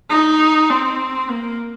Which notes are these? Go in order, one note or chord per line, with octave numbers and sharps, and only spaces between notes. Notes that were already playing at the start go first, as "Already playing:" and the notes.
D#4
C4
A#3